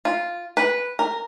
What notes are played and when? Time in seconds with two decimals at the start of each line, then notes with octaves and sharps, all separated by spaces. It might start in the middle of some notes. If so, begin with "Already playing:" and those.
0.05 F4
0.57 B4
0.99 A#4